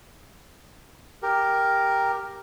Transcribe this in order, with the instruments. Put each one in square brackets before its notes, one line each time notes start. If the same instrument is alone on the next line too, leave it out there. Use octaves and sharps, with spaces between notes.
[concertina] G4 A#4